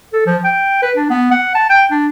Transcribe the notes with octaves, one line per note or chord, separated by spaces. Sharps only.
A4
F3
G5
B4
D4
B3
F#5
A5
G5
D4